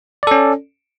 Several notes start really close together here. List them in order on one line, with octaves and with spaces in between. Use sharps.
D5 A4 C#4